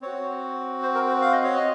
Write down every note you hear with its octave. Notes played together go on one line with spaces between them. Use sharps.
C4 F#4 C#5
C5
A#4
C5
F5
D#5
C#5
D#5